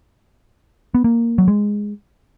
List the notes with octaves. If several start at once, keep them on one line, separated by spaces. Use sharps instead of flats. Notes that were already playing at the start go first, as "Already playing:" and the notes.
B3
A#3
F#3
G#3